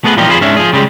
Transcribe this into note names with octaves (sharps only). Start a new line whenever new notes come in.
A3 B3 G#4 B4
A#2 E3 F3 G3 D#4 G4
F2 F4 G#4 C5 B5
G#2 C#4 D4 E5
F3 G#4
C#3 G3 G#3